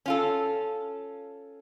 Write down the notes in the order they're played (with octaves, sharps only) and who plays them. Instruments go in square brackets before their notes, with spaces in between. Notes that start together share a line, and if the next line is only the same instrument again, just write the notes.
[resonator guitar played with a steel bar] C#4 F4 A4